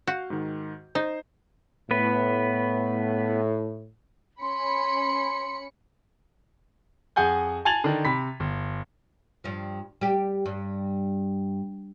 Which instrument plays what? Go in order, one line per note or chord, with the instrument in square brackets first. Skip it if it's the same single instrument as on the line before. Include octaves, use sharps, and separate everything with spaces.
[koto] F#4 [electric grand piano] F5 G6
[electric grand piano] G#2 D#3
[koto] D#4 [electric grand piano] C5
[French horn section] A2 [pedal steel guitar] B3 B4
[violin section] C#4 B5 C#7 [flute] C6
[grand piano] F2 G#4 F#5 G#5 G6
G#5 A5 G#6 A6 F7 F#7
D3 D#3
C3 B5 B6
G1
[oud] G2 F3
G3 G4
G2